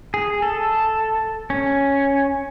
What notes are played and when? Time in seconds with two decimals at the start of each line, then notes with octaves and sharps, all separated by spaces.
0.14 G#4
0.42 A4
1.50 C#4